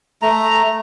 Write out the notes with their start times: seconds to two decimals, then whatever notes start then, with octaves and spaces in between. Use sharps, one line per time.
0.22 A3 A#5